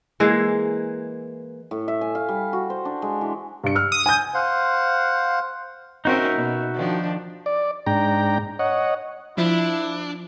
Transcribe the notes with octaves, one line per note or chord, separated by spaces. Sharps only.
E3 G#3 A#3
A2
E5
G#5
F5
G3
F#4
C5
D4
G#3
E3
G2 C#7
E6 F6
D#6
G#5 G6
C5 F5 F#5
C4 C#4 D#4 F#4 A#4 E5
B2
D#3 F3 D4
D5
G#2 D4 G5 A#5
C#5 D#5 F#5
F3 D4 E4